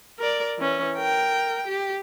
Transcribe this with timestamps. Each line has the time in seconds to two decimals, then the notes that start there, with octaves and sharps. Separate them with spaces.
0.19 A#4 D5
0.58 E3 C#4
0.97 A#4 G5
1.67 G4